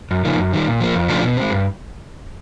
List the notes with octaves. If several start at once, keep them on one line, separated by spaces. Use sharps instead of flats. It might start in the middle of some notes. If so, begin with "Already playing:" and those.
F#2
C#3 F3 A#3 D#4
F#2
D#3 G3
A#2
F3 A#3
F2
C#3 F3 A3 D4
B2
G#3 C4
G2